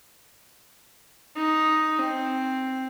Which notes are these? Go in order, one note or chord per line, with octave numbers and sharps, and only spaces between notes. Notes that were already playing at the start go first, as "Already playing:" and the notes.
D#4
C4